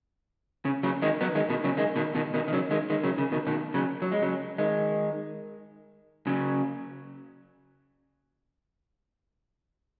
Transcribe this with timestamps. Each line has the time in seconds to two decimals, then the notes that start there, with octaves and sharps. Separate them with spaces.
0.65 C#3
0.83 C#3 F#3
1.02 D#3 G#3
1.21 F#3 B3
1.35 D#3 G#3
1.50 B2 D#3
1.64 C#3 F#3
1.77 D#3 G#3
1.96 B2 D#3
2.15 B2 D#3
2.34 B2 D#3
2.48 D#3
2.53 C#3 F#3
2.71 D#3 G#3
2.90 D#3 G#3
3.04 C#3 F#3
3.18 C#3
3.32 B2 D#3
3.47 B2 D#3
3.74 C#3 F#3
4.02 F#3
4.12 G#3
4.22 C#3 F#3
4.58 D#3 G#3
6.27 C#3 F#3